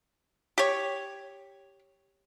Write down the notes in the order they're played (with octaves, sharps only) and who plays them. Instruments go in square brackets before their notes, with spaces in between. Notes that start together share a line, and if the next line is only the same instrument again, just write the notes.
[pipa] G4 C#5